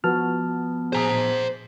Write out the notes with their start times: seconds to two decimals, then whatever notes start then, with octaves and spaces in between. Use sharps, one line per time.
0.04 F3 B3 F#4 B4 A5 F6
0.93 G#4 C5 G#5 A#5 D#6